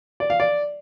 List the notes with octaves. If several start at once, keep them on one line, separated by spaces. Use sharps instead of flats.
D5
F5
D5